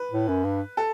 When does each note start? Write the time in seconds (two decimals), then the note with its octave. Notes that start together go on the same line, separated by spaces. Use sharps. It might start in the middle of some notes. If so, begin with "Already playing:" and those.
Already playing: B4
0.11 A2
0.28 F#2
0.44 G2
0.77 A4